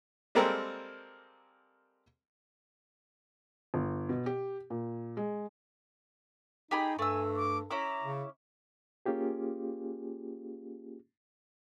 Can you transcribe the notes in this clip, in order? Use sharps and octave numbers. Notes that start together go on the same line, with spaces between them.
G3 G#3 A#3 C4 A4 A#4
G1
B2
G4
A#2
G#3
D#4 G4 G#4 B5
G2 A3 G#5 E6
D6
C#4 E4 A#5 D6
C#3
A#3 C#4 F4 G4 G#4